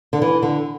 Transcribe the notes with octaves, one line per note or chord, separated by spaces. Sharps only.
D3
E3
D3